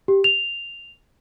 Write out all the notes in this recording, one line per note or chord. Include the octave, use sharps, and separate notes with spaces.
G4
F7